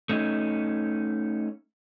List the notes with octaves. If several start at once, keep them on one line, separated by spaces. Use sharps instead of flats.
A3 C#4 D#4